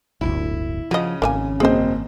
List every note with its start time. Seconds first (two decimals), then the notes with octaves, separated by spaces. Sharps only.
0.21 D1 G1 D2 E4
0.91 C#3 F3 C#4 F#4 D#5
1.22 G#1 A#3 E5 G#5
1.60 F#1 C4 G#4 C5 D#5